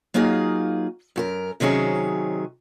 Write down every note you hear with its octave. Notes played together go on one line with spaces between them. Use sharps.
F#3 A#3 D#4 F4 G#4
F#2 F#4 A#4
C3 D#3 F#3 C#4 G#4